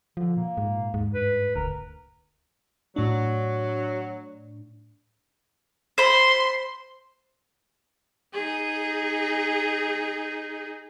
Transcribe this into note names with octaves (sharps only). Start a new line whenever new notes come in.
D3 F3
A#2 A#3
G#2
D#2 G#2
G2 B4
E1 D2 A#4
A2 F#3 D4
C5 B5 C6
D#4 G#4